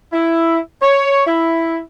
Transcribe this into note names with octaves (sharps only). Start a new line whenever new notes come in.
E4
C#5
E4